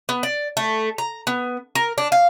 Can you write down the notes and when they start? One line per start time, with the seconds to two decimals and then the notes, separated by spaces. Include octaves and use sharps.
0.09 B3
0.23 D5
0.57 A3
0.98 A#5
1.27 B3
1.75 A#4
1.98 D4
2.12 F5